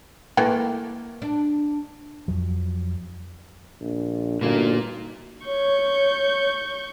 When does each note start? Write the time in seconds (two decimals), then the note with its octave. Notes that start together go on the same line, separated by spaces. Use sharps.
0.37 E3 A3 A#3 G5
1.22 D4
2.28 F2 F3 F#3
3.81 A#1
4.41 G1 A#2 A#3 D#4 F#4
5.46 C#5 C#6 G6